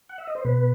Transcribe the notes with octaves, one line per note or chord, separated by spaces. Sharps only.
F#5
E5
D#5
C5
B2 B4